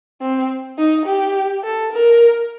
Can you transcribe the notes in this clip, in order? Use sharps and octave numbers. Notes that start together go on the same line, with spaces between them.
C4
D#4
G4
A4
A#4